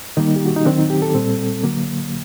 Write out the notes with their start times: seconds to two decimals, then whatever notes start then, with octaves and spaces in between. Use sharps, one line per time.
0.17 D#3 G3 A#3 D#4
0.36 G4
0.46 F#4
0.56 D#4
0.65 D#3 F#3 C4 D4
0.79 D#4
0.90 G4
1.02 A4
1.14 A#2 G3 C4
1.63 D3 F#3 A#3